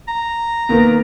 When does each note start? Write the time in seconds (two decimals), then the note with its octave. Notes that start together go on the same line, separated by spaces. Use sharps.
0.08 A#5
0.69 D#3 A#3 B3